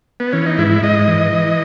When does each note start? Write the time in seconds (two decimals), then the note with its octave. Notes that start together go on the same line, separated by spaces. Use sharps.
0.20 B3
0.33 E3 C#4
0.46 D#4
0.58 G#2 E4
0.83 G#2 D#5
1.08 E3
1.32 E3